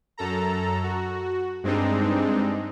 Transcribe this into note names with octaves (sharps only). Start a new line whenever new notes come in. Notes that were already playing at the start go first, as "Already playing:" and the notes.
F#2 A4 A#5
F#4
G2 G#3 C4 D4 D#4